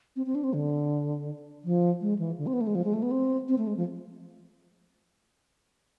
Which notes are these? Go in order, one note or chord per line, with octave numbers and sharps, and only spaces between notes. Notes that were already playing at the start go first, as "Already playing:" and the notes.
C4
C4
D4
C4
D3
F3
G#3
E3
D3
C4
B3
A3
G#3
F3
G#3
A3
B3
C4
C4
A3
G#3
F3